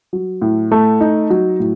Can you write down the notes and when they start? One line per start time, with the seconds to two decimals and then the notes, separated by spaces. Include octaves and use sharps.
0.13 F#3
0.42 A2
0.72 A3
1.01 D#4
1.30 F#3
1.60 A2